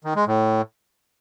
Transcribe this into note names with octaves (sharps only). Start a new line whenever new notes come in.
D#3
G#3
A2